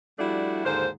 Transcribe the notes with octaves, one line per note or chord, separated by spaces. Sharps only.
F3 G3 A3 D4 E4 F#4
D#2 G#2 D3 F4 C5